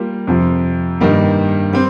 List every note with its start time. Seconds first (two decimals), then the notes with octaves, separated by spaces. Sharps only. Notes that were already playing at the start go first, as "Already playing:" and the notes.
Already playing: G3 A#3 F4
0.27 F2 C3 F3
1.00 G2 D#3 G3 A#3
1.73 G3 C4